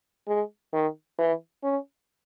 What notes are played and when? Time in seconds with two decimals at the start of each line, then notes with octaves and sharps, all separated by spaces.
0.28 G#3
0.73 D#3
1.19 E3
1.63 C#4